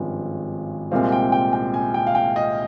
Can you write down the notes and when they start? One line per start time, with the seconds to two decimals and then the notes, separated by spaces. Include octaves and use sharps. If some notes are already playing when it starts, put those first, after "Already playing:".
Already playing: G#1 G2 F3 G#3 C#4
0.91 C2 A#2 G#3 C4 F5
1.12 G5
1.32 G5
1.53 G5
1.74 G#5
1.94 G5
2.07 F5
2.15 G5
2.36 D#5